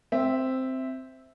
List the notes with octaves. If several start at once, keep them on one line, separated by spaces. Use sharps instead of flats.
C4 E5